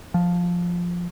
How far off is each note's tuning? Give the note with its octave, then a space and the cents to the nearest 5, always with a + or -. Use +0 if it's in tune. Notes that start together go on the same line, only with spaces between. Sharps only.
F3 +5